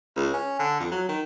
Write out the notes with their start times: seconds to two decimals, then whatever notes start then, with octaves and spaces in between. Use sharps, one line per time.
0.16 C#2
0.33 C#4
0.59 D3
0.80 F2
0.91 F#3
1.09 D#3